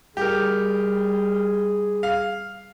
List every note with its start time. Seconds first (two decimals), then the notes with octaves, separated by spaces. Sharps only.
0.17 G3 G4 G#4 A#4
2.03 F5